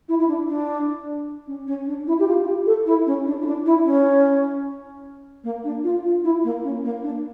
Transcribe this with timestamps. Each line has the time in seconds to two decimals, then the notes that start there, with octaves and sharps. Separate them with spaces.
0.09 E4
0.20 E4
0.28 D4
0.48 D4
1.47 C#4
1.67 C#4
1.87 D4
2.07 E4
2.20 G4
2.27 F4
2.47 G4
2.67 A4
2.86 E4
3.07 C#4
3.26 D4
3.41 E4
3.46 D4
3.66 E4
3.85 C#4
5.44 A#3
5.64 D4
5.84 F4
6.04 F4
6.24 E4
6.44 A#3
6.64 C#4
6.84 A#3
7.03 D4